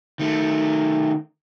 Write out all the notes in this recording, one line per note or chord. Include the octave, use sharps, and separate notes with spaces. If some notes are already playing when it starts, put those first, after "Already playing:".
D#3 A3